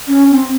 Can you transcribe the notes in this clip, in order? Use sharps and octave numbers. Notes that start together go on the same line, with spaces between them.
C#4
C4